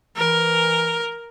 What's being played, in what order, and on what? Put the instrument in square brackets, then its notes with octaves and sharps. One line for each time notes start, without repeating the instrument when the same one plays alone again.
[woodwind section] E3 [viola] A#4